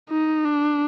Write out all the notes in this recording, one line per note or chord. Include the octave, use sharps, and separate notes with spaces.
D#4
D4